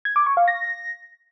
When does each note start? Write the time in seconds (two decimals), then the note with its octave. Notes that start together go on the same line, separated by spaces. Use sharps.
0.05 G#6
0.16 D6
0.26 C#6
0.37 F5
0.48 A#6